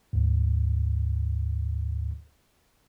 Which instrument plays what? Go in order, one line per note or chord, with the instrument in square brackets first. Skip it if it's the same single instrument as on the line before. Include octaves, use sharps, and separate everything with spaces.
[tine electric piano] D2 G#2